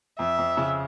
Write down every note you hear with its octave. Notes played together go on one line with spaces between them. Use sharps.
F2 E5
F2
C#3